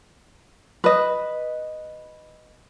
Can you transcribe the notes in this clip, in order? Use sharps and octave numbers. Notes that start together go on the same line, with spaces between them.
B4 D#5